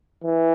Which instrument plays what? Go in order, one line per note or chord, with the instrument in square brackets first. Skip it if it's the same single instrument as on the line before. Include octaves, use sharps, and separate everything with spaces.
[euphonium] E3